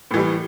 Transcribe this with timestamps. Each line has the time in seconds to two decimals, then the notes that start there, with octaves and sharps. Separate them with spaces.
0.11 A2
0.14 E3
0.17 G3